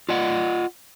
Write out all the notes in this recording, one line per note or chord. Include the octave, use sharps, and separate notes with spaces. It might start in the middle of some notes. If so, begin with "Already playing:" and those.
F4 D5 D#5 F#5